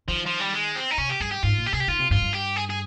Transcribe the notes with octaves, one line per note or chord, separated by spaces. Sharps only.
D#3 F3
F3
G3
G#3
C4
D#4
C3 C#4
G4
G2 G#4
G4
G#2 F4
A#2
G4
C3 G#4
G4
D#3 F4
C3
G2 F4
G2
G4
G#4
G#4